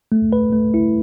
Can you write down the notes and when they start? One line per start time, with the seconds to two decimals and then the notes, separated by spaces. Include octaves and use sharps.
0.12 A3
0.33 B4
0.53 A3
0.74 E4